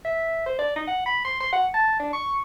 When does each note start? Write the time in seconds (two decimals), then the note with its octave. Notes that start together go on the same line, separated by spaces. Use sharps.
0.05 E5
0.46 C5
0.59 D5
0.76 D#4
0.87 F#5
1.06 B5
1.25 C6
1.40 C6
1.52 F#5
1.74 A5
1.99 D4
2.13 C#6